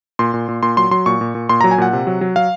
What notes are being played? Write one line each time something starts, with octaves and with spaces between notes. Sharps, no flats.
A#2 C6
A#2
A#2
A#2 C6
F#3 C6
F#3 C6
A#2 C#6
A#2
A#2
A#2 C6
F#3 A#5
G#5
A#2 F#5
C3
F#3
F#3
F#3 F5